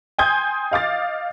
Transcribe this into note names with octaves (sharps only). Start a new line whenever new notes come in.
G5 G#5 C6 D#6 G6 G#6
D#5 F5 D6 A6